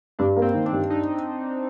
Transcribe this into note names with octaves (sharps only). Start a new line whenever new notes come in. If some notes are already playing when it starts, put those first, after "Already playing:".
G2 D4
A#3
C4
D#3
D4
G2
D4 D#4